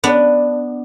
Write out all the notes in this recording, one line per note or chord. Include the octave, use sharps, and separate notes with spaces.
B3 D4